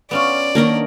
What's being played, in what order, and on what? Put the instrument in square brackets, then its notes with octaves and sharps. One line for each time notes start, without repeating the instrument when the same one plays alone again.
[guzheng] B3 C#4 F4 [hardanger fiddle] D5
[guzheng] D#3 F#3 D4 [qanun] A#3 A#4 D#5